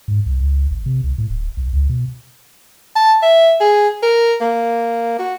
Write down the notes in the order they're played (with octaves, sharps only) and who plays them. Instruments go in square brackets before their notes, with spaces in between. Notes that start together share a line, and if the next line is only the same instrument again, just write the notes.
[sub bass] G#2
C2
C#2
A1
C3
C2
A2
D1
B1
C#2
B2
[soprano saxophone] A5
E5
G#4
A#4
A#3
F#4